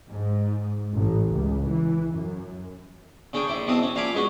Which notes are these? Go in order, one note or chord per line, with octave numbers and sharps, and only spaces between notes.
G#2
A1
C#2
E3
F#2
C#3 C#4 D4 G#4 G5
A#1 E4 D5 C6
E2 B2 E3 C4 A5 D#6
C#4
A#2 F5 G#5 A5 B5 D6
G#3 B3 C#4 F#4